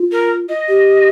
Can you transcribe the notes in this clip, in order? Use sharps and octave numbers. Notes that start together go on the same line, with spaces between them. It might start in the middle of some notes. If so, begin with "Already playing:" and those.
Already playing: F4
A#4
D#5
G4